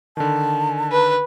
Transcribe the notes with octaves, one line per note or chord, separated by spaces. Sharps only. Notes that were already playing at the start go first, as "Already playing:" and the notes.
D3 D#3 A5
B4